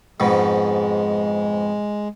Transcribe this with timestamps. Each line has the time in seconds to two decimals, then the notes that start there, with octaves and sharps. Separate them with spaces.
0.20 F2 G#2 B2 G#3